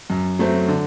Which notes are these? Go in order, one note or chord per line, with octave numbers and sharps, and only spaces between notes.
F#2
F#3 A3 C4
D3